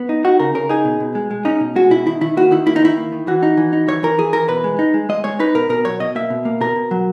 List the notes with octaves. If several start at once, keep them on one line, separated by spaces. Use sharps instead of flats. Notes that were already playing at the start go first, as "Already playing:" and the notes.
Already playing: B3
D#4
D#4 F#4
C#3 A#4
C#3 A#4
D#4 G#4
B2
B2
G#3
G#3
C#4 D#4
B2
G#3 F#4
B2 E4
D#3 E4
D#3 E4
A#3 F#4
D#3 E4
A#3 E4
D#4
D#3 E4
A#3
D#3
E3 F#4
D#4
E3
D#4
E3 C#5
E3 A#4
E3 G#4
E3 A#4
B2 B4
G#3
D#4
G#3
G#3 D#5
G#3 C#5
D#4 B4
B2 A#4
B2 A#4
F#3 C#5
B2 D#5
A#3 E5
B2
A#3
B2 A#4
B2
F#3